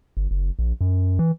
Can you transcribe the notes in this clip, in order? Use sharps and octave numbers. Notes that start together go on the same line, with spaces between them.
G1
F#1
A#1
F#2
E3